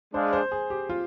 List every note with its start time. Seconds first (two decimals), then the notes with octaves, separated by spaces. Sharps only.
0.14 G#3 D4 G#4 C5 D5 F5
0.33 C5
0.52 G#4
0.70 G4
0.89 F4